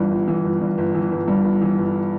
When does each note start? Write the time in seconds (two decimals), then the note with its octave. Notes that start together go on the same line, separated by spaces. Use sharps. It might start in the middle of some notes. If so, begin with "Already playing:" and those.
Already playing: G1 G2 E3
0.11 G1
0.28 E3
0.44 G1
0.61 G2
0.78 G1
0.95 E3
1.11 G1
1.28 G2
1.44 G1
1.61 E3
1.78 G1